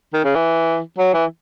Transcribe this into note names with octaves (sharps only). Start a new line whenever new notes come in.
D#3
C#3
E3
F#3
E3